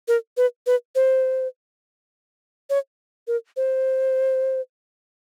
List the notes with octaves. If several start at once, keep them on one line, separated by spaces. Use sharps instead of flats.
A#4
B4
B4
C5
C#5
A#4
C5